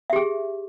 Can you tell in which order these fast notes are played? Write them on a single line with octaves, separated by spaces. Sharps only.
E5 G4 G#4